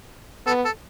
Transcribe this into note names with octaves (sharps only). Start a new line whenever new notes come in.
B3 A4
A4